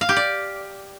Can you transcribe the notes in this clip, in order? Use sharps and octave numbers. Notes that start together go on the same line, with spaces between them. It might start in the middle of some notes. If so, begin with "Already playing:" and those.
F5
G4
D5